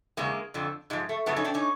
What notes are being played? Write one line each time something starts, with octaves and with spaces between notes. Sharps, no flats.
E2 C#3 G#3 A#3
F2 D3 F3
G#2 F3 G#3
A3
F#2 C#3 F3 A3 B3
C#4 D#4
C4 D4
C#4 D#4